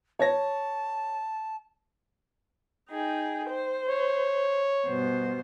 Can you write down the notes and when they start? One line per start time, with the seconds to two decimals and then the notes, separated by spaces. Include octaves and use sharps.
0.19 C#5 A5 G#6 A#6
2.89 D#4 G#4 G5
3.49 C5
3.89 C#5
4.85 G2 B2 C5